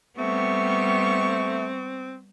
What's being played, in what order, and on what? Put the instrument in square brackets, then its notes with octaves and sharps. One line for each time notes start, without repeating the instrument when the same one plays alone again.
[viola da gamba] G3 B3 [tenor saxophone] A3 [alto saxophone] C4 [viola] C#6